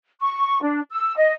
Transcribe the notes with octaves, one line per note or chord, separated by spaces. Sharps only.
C#6
D4
E6
D#5